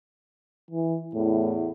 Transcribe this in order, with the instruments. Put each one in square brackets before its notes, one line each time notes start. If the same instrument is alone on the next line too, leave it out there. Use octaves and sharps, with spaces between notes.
[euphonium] E3
[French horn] E2 [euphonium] A2